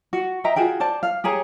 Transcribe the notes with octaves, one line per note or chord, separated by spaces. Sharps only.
F#4
D#5 E5 G5 A#5
F4 F#4 G#4 G5
C5 D5 A5
F5
G4 G#4 C#5 A#5